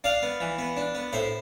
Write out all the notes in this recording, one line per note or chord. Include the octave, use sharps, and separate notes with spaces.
D4 D5 F5
B3
E3
B3
D4
B3
A2 C5 E5